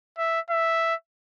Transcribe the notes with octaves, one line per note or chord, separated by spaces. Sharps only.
E5
E5